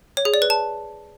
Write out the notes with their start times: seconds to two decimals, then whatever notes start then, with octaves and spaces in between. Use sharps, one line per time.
0.17 C#5
0.25 G#4
0.34 D5
0.42 B4
0.50 A5